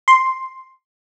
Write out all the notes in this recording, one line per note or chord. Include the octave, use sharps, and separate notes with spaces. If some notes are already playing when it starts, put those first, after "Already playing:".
C6